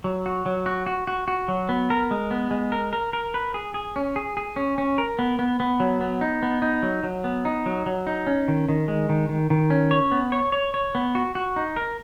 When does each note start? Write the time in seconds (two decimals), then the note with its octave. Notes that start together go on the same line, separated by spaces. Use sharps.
0.04 F#3
0.26 F#4
0.46 F#3
0.66 F#4
0.86 F#4
1.07 F#4
1.28 F#4
1.48 F#3
1.69 B3
1.90 A#4
2.11 G#3
2.31 B3
2.51 G#3
2.72 A#4
2.93 A#4
3.13 A#4
3.34 B4
3.54 G#4
3.74 G#4
3.96 C#4
4.16 G#4
4.37 G#4
4.56 C#4
4.78 C#4
4.98 A#4
5.19 B3
5.39 B3
5.60 B3
5.80 F#3
6.01 B3
6.21 D#4
6.43 B3
6.62 D#4
6.83 F#3
7.03 F#3
7.24 B3
7.45 D#4
7.66 F#3
7.86 F#3
8.07 D#4
8.27 C#4
8.48 D#3
8.69 D#3
8.88 G#3
9.09 D#3
9.29 D#3
9.50 D#3
9.70 C#4
9.91 C#5
10.12 B3
10.32 C#5
10.52 C#5
10.74 C#5
10.95 B3
11.15 F#4
11.35 F#4
11.56 D#4
11.76 A#4